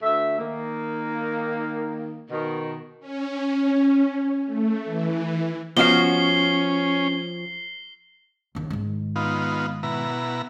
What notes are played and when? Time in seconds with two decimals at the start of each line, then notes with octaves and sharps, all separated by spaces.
0.02 D2 A3 E5
0.38 D#3 A#3
2.29 B2 D#3
3.00 C#4
4.46 A3
4.85 E3
5.77 F3 B3 C#4 F#4 D#5 F5 C7 G7
8.55 A#1 D#2
8.70 G#2 D#3
9.16 B3 D#4 F4
9.83 B2 E4 A#5